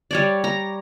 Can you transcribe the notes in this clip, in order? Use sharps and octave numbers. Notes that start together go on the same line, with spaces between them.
G3 C#5 D5
A#5